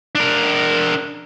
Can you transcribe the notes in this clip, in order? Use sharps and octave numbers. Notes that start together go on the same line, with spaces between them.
D4 A#4